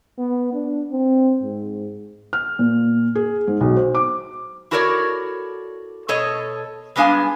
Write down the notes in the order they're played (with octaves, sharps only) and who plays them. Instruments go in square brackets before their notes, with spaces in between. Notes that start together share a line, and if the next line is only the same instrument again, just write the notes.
[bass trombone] B3
D4
C4
G#2
[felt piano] F6
A#2
G#4
G#2
B1
C5
D6
[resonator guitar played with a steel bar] E4 F#4 A4 A#4 C#5 D5
B2 A4 C#5 D#5
G3 G#3 B3 D4 F5 G#5